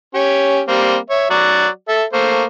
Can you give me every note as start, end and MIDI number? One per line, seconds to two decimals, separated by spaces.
0.15 0.61 61
0.15 0.61 67
0.15 0.61 73
0.68 0.97 55
0.68 0.97 58
0.68 0.97 60
1.10 1.26 73
1.10 1.26 76
1.30 1.68 54
1.30 1.68 66
1.30 1.68 74
1.88 2.04 69
1.88 2.04 76
2.13 2.44 57
2.13 2.44 58
2.13 2.44 72